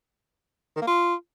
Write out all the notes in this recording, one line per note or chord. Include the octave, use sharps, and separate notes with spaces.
D#3
A#3
F4